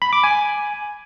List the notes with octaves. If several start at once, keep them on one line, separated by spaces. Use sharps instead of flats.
B5
D6
G#5